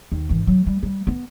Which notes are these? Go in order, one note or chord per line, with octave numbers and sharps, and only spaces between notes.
D#2
G#1 E3
F#3
G3
G3
B3